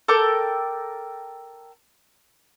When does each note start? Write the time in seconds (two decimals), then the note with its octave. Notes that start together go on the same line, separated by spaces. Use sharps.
0.08 A4 A#4 G5 D6